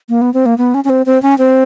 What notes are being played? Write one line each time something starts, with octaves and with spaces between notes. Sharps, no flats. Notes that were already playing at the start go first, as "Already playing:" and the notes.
A#3
B3
C4
A#3
B3
C#4
C#4
C4
C4
C#4
C4